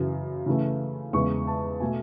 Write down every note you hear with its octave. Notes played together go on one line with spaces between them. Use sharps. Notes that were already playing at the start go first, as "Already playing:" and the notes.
Already playing: F#2 C#3 E3
C#3 E3 A3
E2 C#3 G#3 C#6
A5
B2 A3 G#5